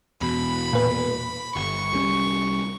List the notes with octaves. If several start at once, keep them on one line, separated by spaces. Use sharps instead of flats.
E2 B2 B5
A#2 B4
G1 C#6
C2 G3 C#4